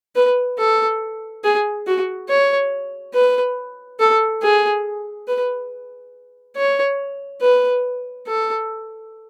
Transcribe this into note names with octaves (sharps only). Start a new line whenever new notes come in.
B4
A4
G#4
F#4
C#5
B4
A4
G#4
B4
C#5
B4
A4